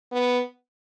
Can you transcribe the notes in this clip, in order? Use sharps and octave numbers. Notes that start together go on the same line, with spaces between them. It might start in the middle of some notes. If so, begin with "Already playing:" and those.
B3